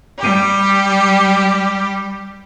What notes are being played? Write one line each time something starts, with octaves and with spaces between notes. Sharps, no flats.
G3 G4